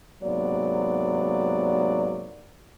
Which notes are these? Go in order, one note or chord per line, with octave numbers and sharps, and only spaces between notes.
G#2 C3 F#3 A#3 B3 D5